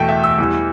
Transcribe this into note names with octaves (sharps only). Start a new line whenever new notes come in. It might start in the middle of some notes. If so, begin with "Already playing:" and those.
Already playing: E2 B2 A3 G5 A5
E5
E6
E2 E3 G3